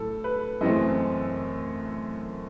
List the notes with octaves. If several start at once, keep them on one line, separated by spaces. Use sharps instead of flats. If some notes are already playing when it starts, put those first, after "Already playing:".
Already playing: A2 F#3 A4
B4
F#2 E3 A3 C4 D#5